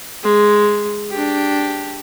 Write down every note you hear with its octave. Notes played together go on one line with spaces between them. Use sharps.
G#3
D4 G4